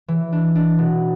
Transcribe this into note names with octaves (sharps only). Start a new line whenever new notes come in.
E3
D4
D4
B2